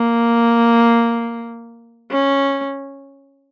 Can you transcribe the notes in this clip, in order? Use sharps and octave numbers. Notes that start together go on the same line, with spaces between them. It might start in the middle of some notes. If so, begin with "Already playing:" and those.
Already playing: A#3
C#4